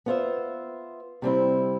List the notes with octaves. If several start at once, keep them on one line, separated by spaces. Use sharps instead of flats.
B3 F4 C5 E5
C3 G3 C4 E4